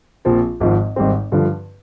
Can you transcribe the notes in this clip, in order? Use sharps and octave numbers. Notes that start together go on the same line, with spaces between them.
A#1 A#2 F3 C4
G#1 G#2 F3
G#1 G#2 G3 C4
G2 D3 F3